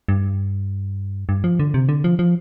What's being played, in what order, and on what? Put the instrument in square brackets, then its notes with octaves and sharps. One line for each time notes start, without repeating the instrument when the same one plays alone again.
[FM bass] G2
G2
F3
D3
C3
D3
F3
F3